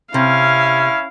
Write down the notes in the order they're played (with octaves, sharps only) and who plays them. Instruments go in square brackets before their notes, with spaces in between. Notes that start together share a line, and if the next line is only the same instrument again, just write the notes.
[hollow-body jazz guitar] C3 [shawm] C#4 [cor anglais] E4 [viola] F5